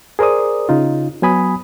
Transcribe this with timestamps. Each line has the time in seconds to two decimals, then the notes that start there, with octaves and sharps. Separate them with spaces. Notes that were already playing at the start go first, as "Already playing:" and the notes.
0.19 G#4 A#4 C5 D5 D#6
0.69 C#3 D#4 F4
1.22 F#3 B3 G#5 B5 D#6